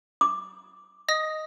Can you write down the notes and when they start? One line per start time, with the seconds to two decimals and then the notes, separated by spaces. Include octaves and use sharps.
0.21 D6
1.09 D#5 D#6 A#6